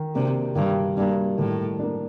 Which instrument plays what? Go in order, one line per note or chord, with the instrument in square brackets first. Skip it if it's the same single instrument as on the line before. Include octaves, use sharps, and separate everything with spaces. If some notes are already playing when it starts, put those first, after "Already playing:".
Already playing: [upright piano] D#3
[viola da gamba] C3 [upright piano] A#3 D4
[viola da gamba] G2 [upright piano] D#3
[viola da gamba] G2 [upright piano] A#3 D4
[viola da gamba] A2 [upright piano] D#3
[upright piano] A#3 D4